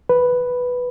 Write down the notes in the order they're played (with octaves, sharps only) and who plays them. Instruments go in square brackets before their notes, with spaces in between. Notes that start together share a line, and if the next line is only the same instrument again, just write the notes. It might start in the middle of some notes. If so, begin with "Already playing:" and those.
[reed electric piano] B4